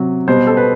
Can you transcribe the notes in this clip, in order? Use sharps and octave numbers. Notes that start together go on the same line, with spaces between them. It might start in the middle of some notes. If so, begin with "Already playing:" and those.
Already playing: C3 F#3
B2 G3 C5
A4
B4